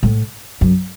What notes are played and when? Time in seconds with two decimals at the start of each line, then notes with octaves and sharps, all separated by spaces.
0.03 A2
0.61 F#2